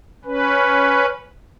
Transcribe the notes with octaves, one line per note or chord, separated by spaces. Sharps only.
C#4 B4